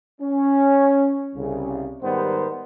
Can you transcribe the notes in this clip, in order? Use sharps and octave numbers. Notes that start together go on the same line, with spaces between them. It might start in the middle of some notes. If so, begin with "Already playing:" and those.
C#4
C2 C#3
G#2 D#3 G3 B3 A#4 C5